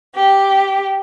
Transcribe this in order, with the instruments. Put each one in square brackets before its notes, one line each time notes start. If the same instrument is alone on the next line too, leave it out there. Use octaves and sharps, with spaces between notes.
[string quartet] G4